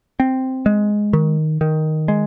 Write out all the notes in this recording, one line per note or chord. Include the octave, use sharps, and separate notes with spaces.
C4
G#3
D#3
D#3
G#3